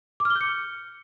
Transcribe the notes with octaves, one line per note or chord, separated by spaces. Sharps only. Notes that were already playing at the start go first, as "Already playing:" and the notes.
D6
F6
G7
G6
C#7